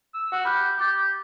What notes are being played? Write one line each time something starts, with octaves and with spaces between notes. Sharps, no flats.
E6
F#4 F#5
G4 B5 F6 F#6
G4 D6 A6